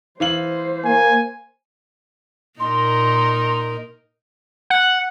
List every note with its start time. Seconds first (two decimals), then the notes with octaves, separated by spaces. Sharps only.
0.20 E3 C5 F5 F#7
0.84 A#3 G#5
2.60 A#2 D#4 A#4 C6
4.70 F#5